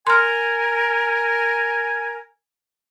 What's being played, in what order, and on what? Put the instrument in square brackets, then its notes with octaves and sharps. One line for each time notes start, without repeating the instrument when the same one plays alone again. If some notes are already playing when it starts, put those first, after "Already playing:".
[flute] A#4 [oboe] G#5 [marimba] C6 F6